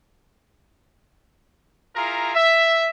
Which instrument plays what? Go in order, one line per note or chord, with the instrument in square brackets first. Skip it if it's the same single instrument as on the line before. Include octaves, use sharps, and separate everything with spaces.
[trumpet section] E4 F4 G#4 A#4 A#5
E5